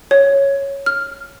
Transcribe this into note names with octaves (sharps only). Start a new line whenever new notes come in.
C#5
F6